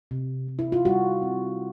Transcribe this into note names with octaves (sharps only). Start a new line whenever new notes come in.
C3
C3
E4
F4
G3 F#4
C4